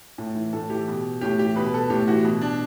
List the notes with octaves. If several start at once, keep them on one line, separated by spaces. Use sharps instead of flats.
A2
E3
A2 A4
E3 G4
B2
A2 G4
E3 G4
B2 B4
B4
A4
A2 G4
E3 F#4
B2
D4